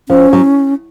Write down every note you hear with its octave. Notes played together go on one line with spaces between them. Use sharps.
F3 C#4
F#3